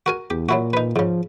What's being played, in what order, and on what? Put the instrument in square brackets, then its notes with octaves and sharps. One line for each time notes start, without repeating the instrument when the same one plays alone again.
[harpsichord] F#4 A#4 G#5
[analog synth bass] E2 [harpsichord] G4
[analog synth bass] A#2 [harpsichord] F#3 E4 F#4
[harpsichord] D#4 B4
[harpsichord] G#2 C#3 [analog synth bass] F3